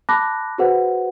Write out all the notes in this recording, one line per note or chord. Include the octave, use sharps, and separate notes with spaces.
A5 B5 D6 F#6 A#6
F#4 G#4 B4 C5 F#5